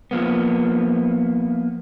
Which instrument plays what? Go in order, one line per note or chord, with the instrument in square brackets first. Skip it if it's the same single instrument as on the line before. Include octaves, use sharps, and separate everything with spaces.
[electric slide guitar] F3 A#3 B3